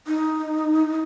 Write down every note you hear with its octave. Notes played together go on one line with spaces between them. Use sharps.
D#4